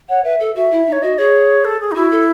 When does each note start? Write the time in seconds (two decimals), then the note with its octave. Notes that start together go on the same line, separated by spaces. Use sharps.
0.09 C#5 F#5
0.24 B4 E5
0.40 A4
0.56 F#4 E5
0.71 E4
0.87 D#4
0.92 C#5
1.02 F#4 D#5
1.18 G#4 C#5
1.65 A4
1.80 G#4
1.92 D#4
1.96 E4 F#4
2.12 A4